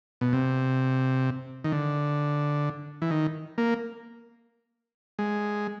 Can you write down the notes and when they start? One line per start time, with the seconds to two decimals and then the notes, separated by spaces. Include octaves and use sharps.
0.21 B2
0.33 C3
1.64 D#3
1.72 D3
3.02 E3
3.10 D#3
3.58 A#3
5.19 G#3